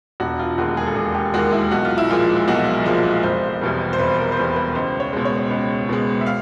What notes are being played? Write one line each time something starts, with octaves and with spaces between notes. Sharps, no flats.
E1 F#4
F4
D#2 D#3 G#3 F#4
G#4
A4
E1 G#4
G4
D#2 D#3 G#3 F#4
E4
B1 F#4
F4
E4
A#2 F3 G#3 F4
B1 F#4
A#2 F3 G#3
F1 C5
E2 B2 G3
C5
F1 B4
A#4
C5
E2 B2 G3 B4
B4
C#2 C5
C#5
B2 G#3
C#5
C#2
B2 G#3
E5
F5